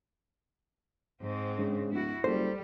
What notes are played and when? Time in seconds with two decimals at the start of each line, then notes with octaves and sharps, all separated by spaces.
1.22 G#2 C4
1.58 C#3 G#3 D4
1.92 D1 E4 F#4
2.24 F#1 G3 A4 C5